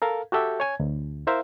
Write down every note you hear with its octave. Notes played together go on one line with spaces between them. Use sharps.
A4 A#4 F5
F#4 G4 A4 E5 G5
C#5 G#5 G#6
D2
E4 A#4 C5 E5 F5